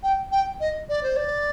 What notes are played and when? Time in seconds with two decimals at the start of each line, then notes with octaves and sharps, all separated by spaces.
0.03 G5
0.31 G5
0.60 D#5
0.89 D5
1.02 C5
1.16 D5